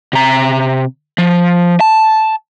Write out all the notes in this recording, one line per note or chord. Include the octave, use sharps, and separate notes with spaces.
C3 A#5
F3
A5